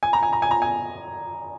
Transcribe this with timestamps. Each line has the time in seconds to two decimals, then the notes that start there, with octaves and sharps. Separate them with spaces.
0.03 G#5
0.13 A#5
0.23 G#5
0.33 A#5
0.42 G#5
0.51 A#5
0.62 G#5